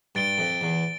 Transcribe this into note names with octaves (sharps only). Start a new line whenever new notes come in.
G2 A6 D7 G7
F2
E2